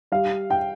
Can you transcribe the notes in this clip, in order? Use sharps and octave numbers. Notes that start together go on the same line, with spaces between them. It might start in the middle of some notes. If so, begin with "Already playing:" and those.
G3 F5
G5